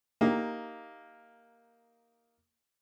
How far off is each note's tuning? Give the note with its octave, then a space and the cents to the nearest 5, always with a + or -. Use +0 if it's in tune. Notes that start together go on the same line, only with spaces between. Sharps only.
A#3 +0 D#4 +10 G4 +0